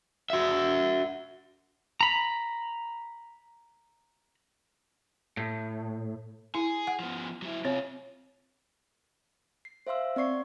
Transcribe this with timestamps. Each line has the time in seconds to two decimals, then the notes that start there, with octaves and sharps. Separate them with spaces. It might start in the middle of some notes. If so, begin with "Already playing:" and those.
0.30 F#4 E5
2.01 A#5 B5
5.37 A2
6.55 E4 G#4
6.87 F#5
7.00 F3 B3
7.42 F#3 E4
7.65 C3 C4 F4 C#5
9.65 C7
9.87 C5 E5 F5 C6 E6
10.16 C4 D5 C#6 C7